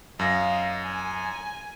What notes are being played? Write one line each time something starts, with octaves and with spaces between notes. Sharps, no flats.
F#2 D#5 F5 A#6
G#5